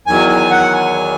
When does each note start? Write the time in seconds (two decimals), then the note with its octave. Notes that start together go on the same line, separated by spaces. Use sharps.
0.07 E2 D#3 F#3 G#5
0.29 G#5
0.51 F#5
0.73 G#5